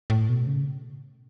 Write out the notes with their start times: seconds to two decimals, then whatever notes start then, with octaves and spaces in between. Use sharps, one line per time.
0.10 A2
0.29 B2
0.47 C#3